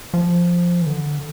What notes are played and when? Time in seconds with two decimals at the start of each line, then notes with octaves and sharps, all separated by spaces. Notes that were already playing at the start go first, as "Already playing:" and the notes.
0.14 F3
0.81 E3
0.86 D3